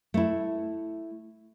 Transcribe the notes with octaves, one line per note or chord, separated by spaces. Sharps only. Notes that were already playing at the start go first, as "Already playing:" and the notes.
A3 E4